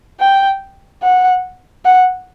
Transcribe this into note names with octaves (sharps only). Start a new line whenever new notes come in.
G5
F#5
F#5